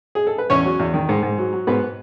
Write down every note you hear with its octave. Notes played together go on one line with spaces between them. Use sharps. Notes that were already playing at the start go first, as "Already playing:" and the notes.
G#4
A4
B4
E2 C#4 C#5
F#3
E2
D#3
G#2
G#2
F#3
F#3
G#2 B3 B4